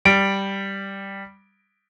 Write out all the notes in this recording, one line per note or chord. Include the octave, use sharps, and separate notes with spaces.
G3 D7